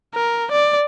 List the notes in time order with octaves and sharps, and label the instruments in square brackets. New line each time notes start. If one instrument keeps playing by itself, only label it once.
[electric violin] A#4
D5